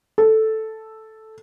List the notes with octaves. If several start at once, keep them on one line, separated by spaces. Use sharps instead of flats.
A4